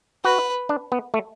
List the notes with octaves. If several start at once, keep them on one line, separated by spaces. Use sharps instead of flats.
F#4 B4
D4
B3
A3